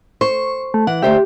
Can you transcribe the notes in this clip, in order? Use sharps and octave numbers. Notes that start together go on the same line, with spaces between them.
C5 C#6
A3
E3 F#5
D2 G4 C5 E5